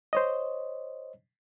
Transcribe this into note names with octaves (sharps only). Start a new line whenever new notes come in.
C5 C#5 D#5